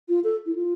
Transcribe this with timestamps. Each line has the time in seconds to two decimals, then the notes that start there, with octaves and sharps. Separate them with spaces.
0.09 F4
0.24 A4
0.46 E4
0.55 F4